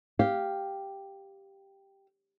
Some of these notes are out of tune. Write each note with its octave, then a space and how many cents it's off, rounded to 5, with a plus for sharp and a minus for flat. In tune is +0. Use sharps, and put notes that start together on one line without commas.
G4 +0 F5 +0